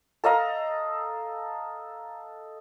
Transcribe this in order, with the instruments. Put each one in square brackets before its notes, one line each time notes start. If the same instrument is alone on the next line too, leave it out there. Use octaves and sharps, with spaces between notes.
[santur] A4 D#5 F5 A#5